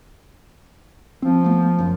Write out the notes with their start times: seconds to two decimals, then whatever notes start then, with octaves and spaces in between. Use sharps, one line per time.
1.22 F3 C4
1.44 A3 B3
1.79 F#1 F#2